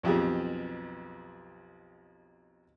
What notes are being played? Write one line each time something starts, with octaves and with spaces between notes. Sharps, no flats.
B1 F2 G4 G#4